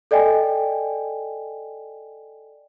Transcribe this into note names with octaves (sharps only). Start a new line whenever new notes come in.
A4 D5 D#5 G5 G#5